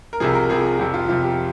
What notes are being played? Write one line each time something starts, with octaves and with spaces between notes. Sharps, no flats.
A#4
C2 C3 F3 G#4
A#4
C2 C3 F3 G#4
F2 C3 F3 G4
F4
F2 C3 F3 F4
G4